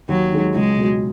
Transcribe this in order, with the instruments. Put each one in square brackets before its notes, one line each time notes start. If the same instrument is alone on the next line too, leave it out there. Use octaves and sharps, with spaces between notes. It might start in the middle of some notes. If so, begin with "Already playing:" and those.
[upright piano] D#2 [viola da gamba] F#3
[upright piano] D#3 G#3 D#4
[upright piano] C#2 [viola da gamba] G#3
[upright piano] B2 F#3